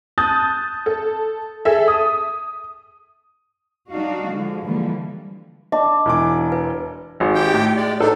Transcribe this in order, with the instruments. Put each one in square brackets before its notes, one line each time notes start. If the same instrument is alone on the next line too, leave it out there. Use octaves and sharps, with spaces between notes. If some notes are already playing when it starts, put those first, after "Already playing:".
[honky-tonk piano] A5 D#6 F#6 G6 A6
A4
G#4 A4 E5
D#6
[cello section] G3 D4 D#4 F#4 F5
D3 F3 G#3
D3 E3 F3 G3 G#3 A#3
[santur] D4 [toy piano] D#5
[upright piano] E1 E3 D6
[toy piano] B4
[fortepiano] G#1
[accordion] G4 G5
[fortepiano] A2
[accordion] G#3 D5
[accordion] A2 D4 D#4 [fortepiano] A4